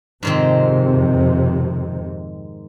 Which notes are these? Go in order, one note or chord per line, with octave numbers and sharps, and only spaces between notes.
F2 G#2 C3 D#3 C4